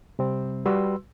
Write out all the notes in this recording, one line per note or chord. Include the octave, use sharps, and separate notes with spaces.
C3 G3 C4
G3 F#4 B4 C6 E6